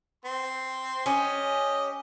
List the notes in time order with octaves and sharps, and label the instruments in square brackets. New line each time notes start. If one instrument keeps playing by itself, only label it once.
[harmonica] C4 C6
[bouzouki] C#4 [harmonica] G4 D#5